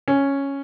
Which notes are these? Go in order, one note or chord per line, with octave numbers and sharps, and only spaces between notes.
C#4